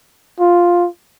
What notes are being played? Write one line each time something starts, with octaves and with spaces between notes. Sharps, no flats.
F4